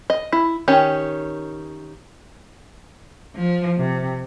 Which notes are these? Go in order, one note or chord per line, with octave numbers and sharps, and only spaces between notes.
D#5
E4
D#3 C#4 G4
F3
C3